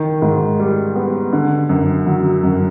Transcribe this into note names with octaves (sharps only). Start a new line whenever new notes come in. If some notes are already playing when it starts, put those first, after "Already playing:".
Already playing: D#3
G#2
G3
B3
D3
F#2
F#3
F#2